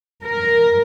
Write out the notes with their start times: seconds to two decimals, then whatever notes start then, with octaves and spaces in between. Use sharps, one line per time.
0.25 A#4